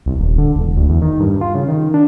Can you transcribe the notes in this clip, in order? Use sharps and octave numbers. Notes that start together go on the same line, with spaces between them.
C2
D#1
D3
E1
D2
E2
D#3
G2
F4
C#3
D#3
D4